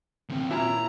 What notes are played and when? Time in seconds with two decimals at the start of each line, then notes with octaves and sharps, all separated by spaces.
0.29 D#2 C4
0.51 A#2 C#4 E4 A5 A#5